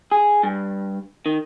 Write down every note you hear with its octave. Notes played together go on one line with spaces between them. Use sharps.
G#4
G2
D#3